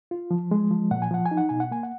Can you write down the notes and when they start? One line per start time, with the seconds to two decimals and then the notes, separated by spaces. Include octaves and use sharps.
0.11 F4
0.31 F3
0.51 G#3
0.71 F3
0.91 A#2 F#5
1.02 G#5
1.11 F3 F#5
1.25 G#5
1.31 D#4
1.37 F#5
1.49 B2 G#5
1.60 F#5
1.71 A#3 G#5
1.83 F#5